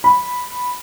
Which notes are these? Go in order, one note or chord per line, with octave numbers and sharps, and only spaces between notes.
B5